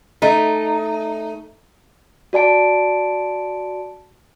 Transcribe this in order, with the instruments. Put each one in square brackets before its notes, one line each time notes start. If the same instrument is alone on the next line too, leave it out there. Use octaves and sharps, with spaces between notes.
[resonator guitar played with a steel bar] A3 D#4
[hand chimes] F#4 D5 A5 D7